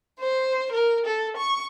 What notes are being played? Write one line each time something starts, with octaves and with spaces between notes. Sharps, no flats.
C5
A#4
A4
C#6